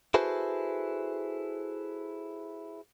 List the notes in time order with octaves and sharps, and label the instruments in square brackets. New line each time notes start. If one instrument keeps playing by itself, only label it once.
[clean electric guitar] E4 F#4 G#4 A4 B4 C5